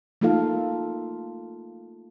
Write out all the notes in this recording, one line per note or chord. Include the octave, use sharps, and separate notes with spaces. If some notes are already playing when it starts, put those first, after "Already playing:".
A3 A#3 D#4 F4 A4 F5